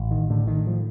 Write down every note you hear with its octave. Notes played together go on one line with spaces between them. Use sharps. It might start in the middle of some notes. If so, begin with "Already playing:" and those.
Already playing: A1
D#3
A2 D3
D#3
F3